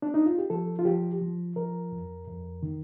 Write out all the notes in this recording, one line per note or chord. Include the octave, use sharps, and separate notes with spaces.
D4
D#4
F4
G4
F3 A4
F4
F3 G4
F3
F3 A#4
F2
F2
D#3